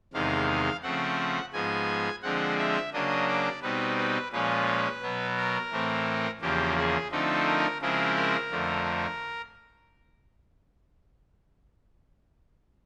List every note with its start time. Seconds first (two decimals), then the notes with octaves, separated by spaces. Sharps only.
0.13 E2 C3 D#3 G#3 F5
0.83 C#3 F3 A3 C4 F#5
1.53 G#2 F3 G#3 B3 G#5
2.22 D3 F3 G#3 C4 F#5
2.58 E5
2.93 C#3 F#3 A#3 D4 D#5
3.28 D5
3.62 B2 G3 C4 D#4 B4
3.98 B4
4.32 A#2 F3 G#3 C#4 B4
5.02 B2 F#3 B3
5.37 A#4
5.72 A2 E3 A3 C4
6.41 E2 C#3 F3 A#3 G4
6.76 G#4
7.11 D3 F3 A3 C4 D#4 A4
7.46 A#4
7.81 C#3 F3 G#3 C4 E4 A#4
8.16 A#4
8.51 F2 D3 F3 A3